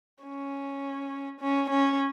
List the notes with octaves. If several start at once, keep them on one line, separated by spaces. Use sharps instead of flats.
C#4
C#4
C#4